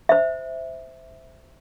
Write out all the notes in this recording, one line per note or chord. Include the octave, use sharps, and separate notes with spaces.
C5 E5